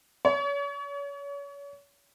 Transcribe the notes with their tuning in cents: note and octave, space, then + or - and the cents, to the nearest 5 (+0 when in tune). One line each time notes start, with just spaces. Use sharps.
C#5 +35